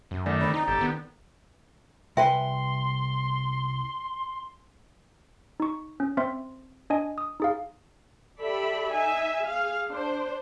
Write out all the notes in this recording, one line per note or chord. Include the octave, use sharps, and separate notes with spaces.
F#2
D#3 A3 D5
D3 C4 D5 B5
D#4 A#5
G1 G4 A4
D#3 B3
C2 B4 E5 G5 G#5 C6
D#4 C#6
C#4
C4 C5 E5 C6
D4 D#5 G#5
D#6
D#4 G#4 F5
G4 A4 D5 E5 B5
D#4 E5 G#5
G#4 F5
D4 C5